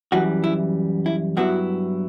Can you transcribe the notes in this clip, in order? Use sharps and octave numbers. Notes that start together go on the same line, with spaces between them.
F#2 E3 G3 F#4
E4
E4
G2 F#3 B3 E4 F#4